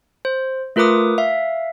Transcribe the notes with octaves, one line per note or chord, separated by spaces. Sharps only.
C5
A3 F4 A#4 B4 D6 D#6
E5 F5